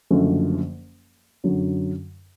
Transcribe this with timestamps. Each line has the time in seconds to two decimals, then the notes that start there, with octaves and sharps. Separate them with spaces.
0.11 F#1 F#2 D3 F3 A3
1.44 F#2 D3 F#3